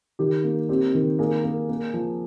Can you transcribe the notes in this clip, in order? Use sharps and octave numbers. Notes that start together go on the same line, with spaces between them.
D#3 G4
A#3
C4 G4
D#3
A#3 G#4
A#3
A#3
F3